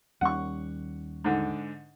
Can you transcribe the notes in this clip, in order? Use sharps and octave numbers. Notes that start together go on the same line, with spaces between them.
D#2 G3 C#4 F#5 C#6
G#2 D3